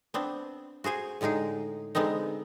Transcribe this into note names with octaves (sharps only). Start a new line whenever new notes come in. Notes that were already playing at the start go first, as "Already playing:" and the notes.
B3 C4 D4
F#4 G#4 C5 G#5
A2 D3 G#3 D#4 G#4
D3 G#3 B3 C4 D#4